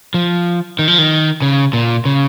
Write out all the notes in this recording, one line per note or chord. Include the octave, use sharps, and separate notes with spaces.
F3
D#3
F3
D#3
C#3
A#2
C#3